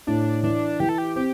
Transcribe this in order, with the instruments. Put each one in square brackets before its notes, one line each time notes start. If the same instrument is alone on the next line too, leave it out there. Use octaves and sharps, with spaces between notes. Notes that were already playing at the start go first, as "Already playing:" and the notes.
[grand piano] A2 [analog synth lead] D4
[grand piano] E3 [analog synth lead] D4
[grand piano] E3 [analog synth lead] G4
[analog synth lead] A4
G4
[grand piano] C4 [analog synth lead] G4